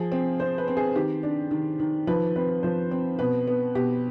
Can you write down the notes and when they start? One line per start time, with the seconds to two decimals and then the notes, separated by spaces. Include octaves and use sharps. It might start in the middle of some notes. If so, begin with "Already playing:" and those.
Already playing: F3 G#4
0.12 C4
0.40 C4 C5
0.58 B4
0.68 C4
0.77 G#4
0.95 D#3 G4
1.23 D4
1.51 D#3
1.80 D#3
2.07 F3 B4
2.36 C4 B4
2.63 F3 C5
2.91 C4
3.19 B2 B4
3.47 B3
3.75 B2 G4